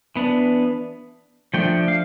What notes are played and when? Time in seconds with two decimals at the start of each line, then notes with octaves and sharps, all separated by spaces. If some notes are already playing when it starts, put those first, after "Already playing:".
0.16 E3 B3 D4
1.54 F3 A3 D4 G5
1.88 F5